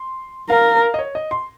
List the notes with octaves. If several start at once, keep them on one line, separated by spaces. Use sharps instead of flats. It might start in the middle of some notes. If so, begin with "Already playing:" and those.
Already playing: C6
A#4 F5
D#5
C#5
D#5
C6